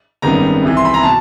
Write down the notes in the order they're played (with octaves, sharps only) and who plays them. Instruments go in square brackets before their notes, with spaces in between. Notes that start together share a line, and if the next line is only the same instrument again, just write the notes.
[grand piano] G#1 F#2 D#3 G3 B3 A#5
C2 C3 E3
C6
B5
A#5
B2 A5